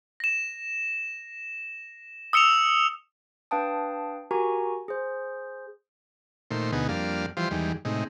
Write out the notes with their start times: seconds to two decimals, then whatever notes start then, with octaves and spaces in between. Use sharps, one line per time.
0.20 A#6 E7
2.33 D#6 E6 C#7 E7 F7
3.51 D4 B4 F5 G5 A5 D#6
4.31 F#4 G4 A#4 G#5 A#5 C#6
4.88 G#4 C5
6.51 A#2 D#3 A3 C5
6.72 D2 B2 B3 D#4 G#4
6.89 F2 G3 A#3 D4 F5
7.37 E3 F3 G3 F4 C5
7.51 E2 D#3 G3 G#3
7.85 A2 C3 G#3 D#4